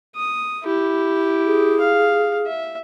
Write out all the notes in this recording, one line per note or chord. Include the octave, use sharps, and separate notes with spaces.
D#6
E4 G4
G#4
F5
E5